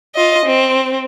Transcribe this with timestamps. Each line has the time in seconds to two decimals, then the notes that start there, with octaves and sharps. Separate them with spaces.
0.15 F4 D#5
0.46 C4